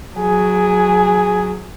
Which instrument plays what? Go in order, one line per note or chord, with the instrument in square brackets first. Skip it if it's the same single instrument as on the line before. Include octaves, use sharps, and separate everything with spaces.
[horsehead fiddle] F#3 G#4